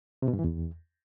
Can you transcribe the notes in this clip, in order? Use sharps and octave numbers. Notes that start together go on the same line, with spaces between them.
C3
B2
G2
E3
E2